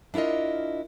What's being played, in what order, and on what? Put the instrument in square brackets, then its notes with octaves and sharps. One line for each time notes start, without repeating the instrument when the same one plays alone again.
[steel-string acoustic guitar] D4 E4 F4 A#4 D#5